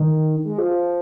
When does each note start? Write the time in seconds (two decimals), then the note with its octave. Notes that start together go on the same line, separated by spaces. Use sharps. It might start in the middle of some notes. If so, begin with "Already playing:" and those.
Already playing: D#3
0.45 G#3
0.58 F3